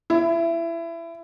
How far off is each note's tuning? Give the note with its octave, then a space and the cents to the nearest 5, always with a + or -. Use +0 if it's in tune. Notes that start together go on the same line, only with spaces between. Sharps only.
E4 +20